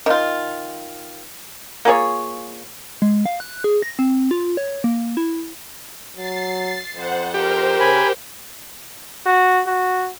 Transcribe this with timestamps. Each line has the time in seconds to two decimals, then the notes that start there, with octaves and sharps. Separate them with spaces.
0.06 D#3 F4
1.85 A#3 F4 G#4 C#5
3.02 G#3
3.26 F5
3.40 F#6
3.64 G#4
3.82 A#6
3.99 C4
4.31 F4
4.57 C#5
4.84 A#3
5.17 E4
6.16 F#3 A6 C7
6.94 F2 C5 F#5
7.34 G4 A#4 C5
7.80 C#3 G#5 B5
9.26 F#4
9.67 F#4